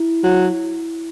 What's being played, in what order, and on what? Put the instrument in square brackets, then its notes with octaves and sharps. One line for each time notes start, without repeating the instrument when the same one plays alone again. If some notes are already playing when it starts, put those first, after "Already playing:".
Already playing: [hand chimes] E4
[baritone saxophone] F#3